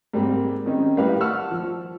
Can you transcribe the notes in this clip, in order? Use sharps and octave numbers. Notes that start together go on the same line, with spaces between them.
G#2 G3 A#3 C4
D#3 C4 C#4 D#4
A2 G3 E4 A#4 B4 F5
F#5 A5 C#6 E6 F6
F3